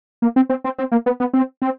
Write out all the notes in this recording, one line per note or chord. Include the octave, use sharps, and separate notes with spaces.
A#3
C4
C4
C4
C4
A#3
B3
B3
C4
C4